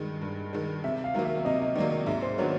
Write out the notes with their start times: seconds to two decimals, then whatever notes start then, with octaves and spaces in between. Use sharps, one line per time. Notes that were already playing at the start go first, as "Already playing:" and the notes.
Already playing: G2 D#3 G#3
0.22 G2
0.53 D#3 G#3
0.84 C3 E5
1.04 F5
1.14 D#3 F#3 A#3
1.25 E5
1.38 E5
1.45 C3 D#5
1.60 D#5
1.75 D#3 F#3 A#3 D5
1.91 D#5
2.06 G#2 E5
2.22 C5
2.38 D#3 F#3 B3 D4 C#5